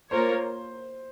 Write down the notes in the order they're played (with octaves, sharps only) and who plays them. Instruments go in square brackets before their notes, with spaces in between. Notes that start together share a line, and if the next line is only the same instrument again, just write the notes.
[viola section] A#3 F4 A#4 C#5 [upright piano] C5